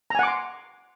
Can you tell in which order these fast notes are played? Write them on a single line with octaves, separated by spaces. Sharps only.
A#5 G#5 F#5 D6 C6